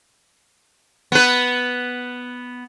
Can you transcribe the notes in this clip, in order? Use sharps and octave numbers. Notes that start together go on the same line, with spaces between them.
B3 B4